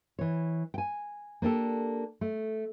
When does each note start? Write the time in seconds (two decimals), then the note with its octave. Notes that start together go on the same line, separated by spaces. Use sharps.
0.19 E3 C#5
0.74 G5 G#5
1.42 A#3 D4 G4 A4
2.21 A3